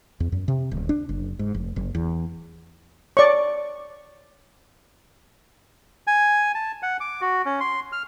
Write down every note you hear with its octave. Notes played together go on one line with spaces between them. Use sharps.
E2
F#2
C3
D1
D4
F#1
G#2
F1
F#1
E2
C#5 D5 C#6
G#5
A5
F#5
D6
F#4
C#4
C6
F6